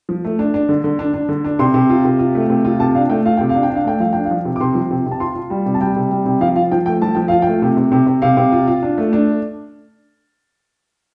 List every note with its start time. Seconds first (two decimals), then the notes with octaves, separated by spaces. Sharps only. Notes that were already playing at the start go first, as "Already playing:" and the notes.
0.09 F3
0.24 A3
0.39 D4
0.54 D4
0.69 D3
0.84 D3
0.99 D4
1.14 D4
1.29 D3
1.44 D4
1.59 C3 C6
1.74 C3
1.90 F4
2.05 C3
2.19 F4
2.35 A3
2.50 C3
2.65 F4
2.80 C3 A5
2.95 D4 F5
3.09 A3 G5
3.25 F4 F5
3.37 C3 G5
3.49 F5
3.55 D4
3.63 G5
3.70 D4
3.75 F5
3.85 A3 G5
4.00 F3 F5
4.13 D4 G5
4.25 F5
4.31 F3
4.45 C3
4.56 D6
4.60 C3 C6
4.75 F3
4.91 C3
5.06 C3
5.11 A5
5.20 F4 C6
5.35 F4
5.50 G3
5.66 C3
5.74 A5
5.81 G3 G5
5.96 C3
6.11 G3
6.26 C3
6.41 F3 F5
6.56 F4 F5
6.71 F3 G5
6.86 A3 G5
7.02 F3 A5
7.15 F3 G5
7.28 F4 F5
7.42 A3 G5
7.62 C3
7.77 C3
7.92 C3
8.06 C3
8.22 C3 F5
8.37 C3
8.52 F4
8.67 F4
8.83 D4
8.98 A3
9.13 D4